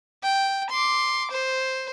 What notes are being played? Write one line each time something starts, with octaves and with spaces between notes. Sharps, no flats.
G5
C6 D6
C5